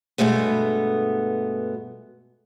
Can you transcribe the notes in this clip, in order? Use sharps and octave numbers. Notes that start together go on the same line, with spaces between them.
G2 B2 G#3 A3 B3